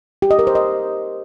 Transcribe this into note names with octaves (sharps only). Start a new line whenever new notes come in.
G4
D#5
A#4
C5
D#5